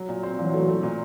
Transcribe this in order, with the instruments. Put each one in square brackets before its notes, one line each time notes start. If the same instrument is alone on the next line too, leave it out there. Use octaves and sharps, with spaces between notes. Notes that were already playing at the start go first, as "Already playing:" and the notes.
Already playing: [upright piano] F#3
A#2
C4
[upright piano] A#2 [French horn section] E3 F#3
[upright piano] A3
A3
A#2